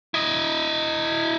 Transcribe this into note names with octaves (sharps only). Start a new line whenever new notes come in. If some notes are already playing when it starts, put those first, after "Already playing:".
E4 D#5